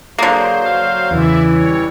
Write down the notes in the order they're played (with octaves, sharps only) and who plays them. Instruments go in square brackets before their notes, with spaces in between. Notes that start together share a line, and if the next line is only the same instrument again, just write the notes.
[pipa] D3 A#3 [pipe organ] F#3 C5 [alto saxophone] G#4
[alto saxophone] F5
[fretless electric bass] E2 C#3 [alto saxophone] E3 [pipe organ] E4 D5 E5
[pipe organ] G3 C#5